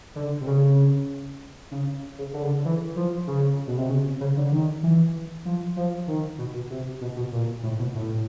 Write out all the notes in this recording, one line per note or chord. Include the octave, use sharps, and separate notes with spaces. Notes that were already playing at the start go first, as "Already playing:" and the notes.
D3
C3
C#3
C#3
C#3
D3
C#3
D3
E3
F3
C#3
B2
C3
C#3
C#3
D3
D#3
E3
F3
F3
D#3
B2
B2
C3
B2
B2
A#2
A2
B2
A2